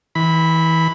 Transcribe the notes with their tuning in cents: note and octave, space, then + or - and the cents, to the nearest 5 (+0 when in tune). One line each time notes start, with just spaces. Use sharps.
E3 -25 B5 +0